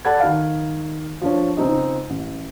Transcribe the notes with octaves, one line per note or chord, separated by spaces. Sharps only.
A4 D5 F#5 A5 B5 G#6
D#3 F5
F3 D4 C#5
C#2 C4 D#4 D#5
A1